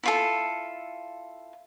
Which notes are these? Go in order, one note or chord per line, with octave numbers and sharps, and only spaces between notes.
E4 F4 A4